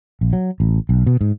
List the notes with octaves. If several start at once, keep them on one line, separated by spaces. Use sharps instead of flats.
A#1
F#3
A1
B1
B2
G#2